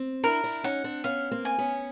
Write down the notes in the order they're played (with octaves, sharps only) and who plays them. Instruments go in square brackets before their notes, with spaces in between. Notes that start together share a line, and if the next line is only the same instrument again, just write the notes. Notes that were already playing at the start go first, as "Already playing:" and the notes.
Already playing: [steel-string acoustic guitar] C4
[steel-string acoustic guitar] D4 E4 [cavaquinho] A#4
[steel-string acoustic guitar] D4 E4
[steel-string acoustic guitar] C#4 D#4 [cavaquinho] F#5
[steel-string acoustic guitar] C4 D4
[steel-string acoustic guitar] B3 C#4 [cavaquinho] F5
[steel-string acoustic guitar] A#3 C4
[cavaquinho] G#5
[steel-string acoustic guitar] B3 C#4